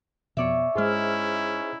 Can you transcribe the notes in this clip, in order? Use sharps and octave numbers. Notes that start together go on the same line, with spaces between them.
F2 B2 B3 C#5 D5 E5
G#2 G#3 C#4 D#4 E4 G#4 C5 F6